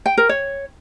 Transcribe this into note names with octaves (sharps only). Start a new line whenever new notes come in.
G5
A#4
C#5